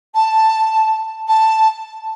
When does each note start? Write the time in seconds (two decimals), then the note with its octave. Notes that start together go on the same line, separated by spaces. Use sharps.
0.14 A5
1.28 A5